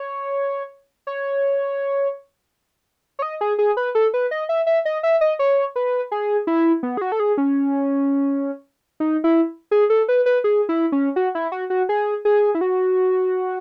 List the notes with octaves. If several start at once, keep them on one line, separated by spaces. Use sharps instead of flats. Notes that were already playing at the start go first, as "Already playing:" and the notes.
Already playing: C#5
C#5
C#5
D#5
G#4
G#4
B4
A4
B4
D#5
E5
E5
D#5
E5
D#5
C#5
B4
G#4
E4
B3
G#4
F#4
A4
G#4
C#4
D#4
E4
G#4
A4
B4
B4
G#4
E4
C#4
F#4
E4
F#4
F#4
G#4
G#4
E4
F#4